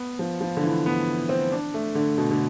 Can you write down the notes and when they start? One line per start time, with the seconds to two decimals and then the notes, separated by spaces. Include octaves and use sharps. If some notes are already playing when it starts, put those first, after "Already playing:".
Already playing: B3
0.19 F3
0.41 F3
0.57 D3
0.64 E3
0.86 B3
1.29 C4
1.52 D4
1.74 A3
1.95 D3
2.18 B2
2.31 D3